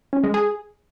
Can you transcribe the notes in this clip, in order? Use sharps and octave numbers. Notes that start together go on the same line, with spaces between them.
C#4
G#3
G#4